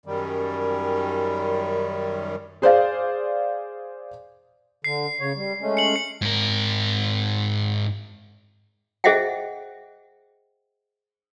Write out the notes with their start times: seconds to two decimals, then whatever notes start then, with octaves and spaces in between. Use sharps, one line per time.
0.06 F#2 D#3 G3
2.62 G#4 C5 D5 F5
4.84 D3 C7
5.20 C#3 C#5
5.36 G3
5.61 G#3 A3 C#4
5.77 C#7 F#7
5.96 C#7
6.22 G#2 A#4
9.04 G#4 C5 D#5 E5 F#5 G5